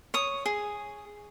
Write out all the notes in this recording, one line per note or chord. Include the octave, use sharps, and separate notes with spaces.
C#5 D#6
G#4